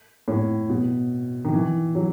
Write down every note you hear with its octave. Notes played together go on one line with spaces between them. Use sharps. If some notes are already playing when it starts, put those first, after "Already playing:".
A2
B2
D#3
E3
F#3